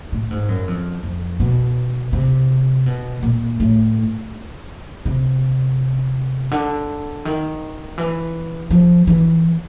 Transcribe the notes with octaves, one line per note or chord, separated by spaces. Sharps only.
A2
G#2
F#2
F2
F2
B2
C3
B2
A#2
A2
C3
D3
D#3
E3
F3
E3